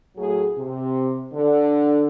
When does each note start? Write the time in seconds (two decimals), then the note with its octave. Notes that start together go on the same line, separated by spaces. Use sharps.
0.16 A2 F#3 G#4
0.57 C3
1.32 D3